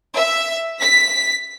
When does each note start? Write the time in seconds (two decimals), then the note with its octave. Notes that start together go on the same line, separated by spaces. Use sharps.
0.15 E5
0.82 B6